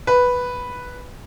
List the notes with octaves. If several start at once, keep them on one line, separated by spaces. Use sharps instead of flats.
B4